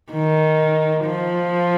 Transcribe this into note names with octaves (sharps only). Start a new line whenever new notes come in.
D#3
F3